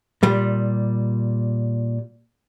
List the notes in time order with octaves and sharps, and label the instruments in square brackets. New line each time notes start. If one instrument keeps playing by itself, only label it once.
[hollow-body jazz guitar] A#2 G3